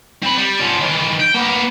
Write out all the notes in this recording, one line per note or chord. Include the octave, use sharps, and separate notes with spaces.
C4 B5
G3
F3 C#4
D#3 E3
G5
A#3 B3